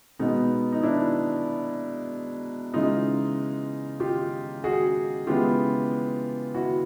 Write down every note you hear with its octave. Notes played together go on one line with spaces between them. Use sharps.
B2 G#3 B3 D#4
D#4
D4 E4
C#3 E3 G#3 D#4 F4
F4 G4
F#4 G#4
C#3 E3 G#3 B3 F4 G4
E4 F#4